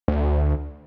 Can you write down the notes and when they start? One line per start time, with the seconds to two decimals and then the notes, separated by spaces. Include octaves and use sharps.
0.08 D2